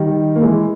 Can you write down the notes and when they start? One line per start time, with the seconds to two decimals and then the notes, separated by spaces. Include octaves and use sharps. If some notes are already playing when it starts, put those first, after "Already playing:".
Already playing: D#3 G3
0.36 A#3
0.42 E3 G#3